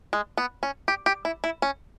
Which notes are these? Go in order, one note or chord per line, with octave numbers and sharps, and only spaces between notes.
G#3
B3
C#4
G4
G4
E4
E4
C#4